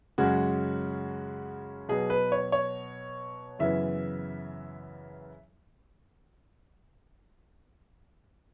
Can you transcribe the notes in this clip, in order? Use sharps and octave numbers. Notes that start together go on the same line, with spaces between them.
F#2 C#3 G#3 C#4 F#4
B2 F#3 B3 G#4
B4
C#5
C#5
F#2 C#3 E3 B3 E5